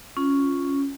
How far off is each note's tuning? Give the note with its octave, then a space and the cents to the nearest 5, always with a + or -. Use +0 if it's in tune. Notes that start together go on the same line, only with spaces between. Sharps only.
C#4 +0 F4 +0